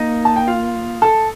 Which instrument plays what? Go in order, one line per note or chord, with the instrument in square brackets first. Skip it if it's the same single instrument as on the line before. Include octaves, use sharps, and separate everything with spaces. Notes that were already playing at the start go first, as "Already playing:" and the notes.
Already playing: [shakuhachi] A#3 [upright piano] D#4 D#5
[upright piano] A5
G5
F4 F5
A4 A5